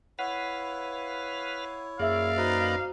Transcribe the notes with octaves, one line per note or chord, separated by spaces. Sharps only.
E4 B4 C#5 F5 F#5
F#2 A#3 G#4 D5 E5 F5 E6
D#4 F#4 B4 C5 D#5 A#5